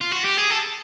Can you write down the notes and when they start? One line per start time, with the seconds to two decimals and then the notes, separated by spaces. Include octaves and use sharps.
0.01 F4
0.12 F#4
0.25 G4
0.38 G#4
0.51 A4